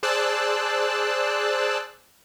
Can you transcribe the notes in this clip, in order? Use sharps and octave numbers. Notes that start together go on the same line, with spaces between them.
G#4 C5 D5 A5 E6 F#6